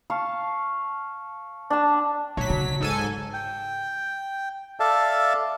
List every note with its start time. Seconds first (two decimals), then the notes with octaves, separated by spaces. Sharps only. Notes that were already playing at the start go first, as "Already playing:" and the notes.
0.10 F5 A5 C#6
1.70 D4 A5
2.37 A#2 F#3 B6
2.50 C#3
2.81 G#2 A4 G#5
3.34 G5
4.80 A4 D5 E5 F5 A5